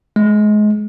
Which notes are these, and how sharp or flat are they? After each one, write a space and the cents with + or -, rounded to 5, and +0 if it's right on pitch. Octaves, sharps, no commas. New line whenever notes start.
G#3 +25